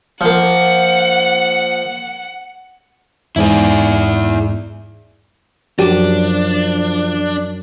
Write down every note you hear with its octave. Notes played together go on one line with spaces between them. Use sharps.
F3 A#3 F#5
E2 G#2 E4 G#4 D5
F#2 F3 D4 F#4 G4 D6